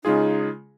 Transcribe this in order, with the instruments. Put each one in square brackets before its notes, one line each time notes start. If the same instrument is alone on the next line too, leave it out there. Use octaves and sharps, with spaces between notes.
[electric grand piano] C#3 G#3 F4 G#4 [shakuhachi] D#4